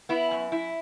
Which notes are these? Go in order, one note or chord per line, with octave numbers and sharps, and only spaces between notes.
B3 E4
F#2
E4